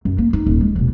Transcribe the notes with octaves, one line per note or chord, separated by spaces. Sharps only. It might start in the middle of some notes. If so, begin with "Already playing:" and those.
F#2
A#3
D#4
D#1
G#3
D#1 B2